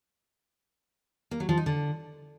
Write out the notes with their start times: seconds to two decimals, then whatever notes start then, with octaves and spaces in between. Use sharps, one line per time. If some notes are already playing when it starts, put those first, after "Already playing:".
1.31 A#3
1.40 F#3
1.49 F3
1.57 D#4
1.66 D3